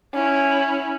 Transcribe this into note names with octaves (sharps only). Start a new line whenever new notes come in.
C#4 E4